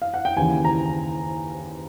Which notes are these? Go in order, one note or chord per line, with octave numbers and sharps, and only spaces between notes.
F5
F#5
G5
D#2 C#3 E3 G#5
A#5